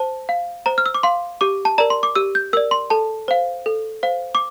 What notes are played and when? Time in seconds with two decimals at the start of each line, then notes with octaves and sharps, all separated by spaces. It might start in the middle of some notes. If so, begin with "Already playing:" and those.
Already playing: C5 A5
0.29 F5
0.66 C5 A#5
0.78 F6
0.86 E6
0.95 D6
1.03 F5 C6
1.41 G4 D6
1.65 A5
1.78 A#4 D5 A#5
1.90 C6
2.03 D6
2.15 G4 E6
2.35 G6
2.53 A#4 D5 E6
2.71 C6
2.90 A4 A5
3.28 C5 F5
3.66 A4
4.03 C5 F5
4.35 D6